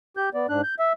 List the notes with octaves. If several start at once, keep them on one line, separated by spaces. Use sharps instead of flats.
G4 G6
B3 D5
G#2 D4 F#6
G6
E5